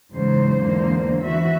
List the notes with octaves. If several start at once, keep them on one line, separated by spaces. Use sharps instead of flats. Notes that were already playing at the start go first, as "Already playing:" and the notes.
E2 G#2 C#3 F#3 C5
E2 D3 A#3 C5
E3 F#4 E5